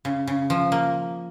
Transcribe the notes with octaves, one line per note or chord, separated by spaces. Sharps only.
C#3
C#3
F3
A#3